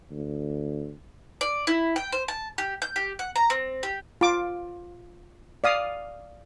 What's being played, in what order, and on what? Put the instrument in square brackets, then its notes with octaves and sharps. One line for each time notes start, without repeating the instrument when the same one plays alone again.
[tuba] D2
[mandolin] D5
E4
G5
C5
A5
G4
G6
G4
F#5
A#5
C4
G4
[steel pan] F4 D6
D5 F5 D#6